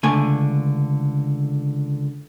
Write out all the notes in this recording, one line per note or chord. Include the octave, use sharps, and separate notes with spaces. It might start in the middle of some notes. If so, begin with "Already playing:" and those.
C#2 D3 A3 G#5